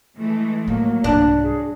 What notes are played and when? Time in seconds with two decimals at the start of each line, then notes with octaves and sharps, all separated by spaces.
0.16 E3 G#3 A3
0.68 A2 F#3 A#3
1.04 C2 G#2 D4
1.43 G#4